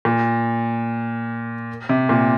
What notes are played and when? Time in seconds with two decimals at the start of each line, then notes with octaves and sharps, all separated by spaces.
0.05 A#2
1.89 C3
2.09 A#2